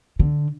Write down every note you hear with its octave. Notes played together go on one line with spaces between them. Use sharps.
D3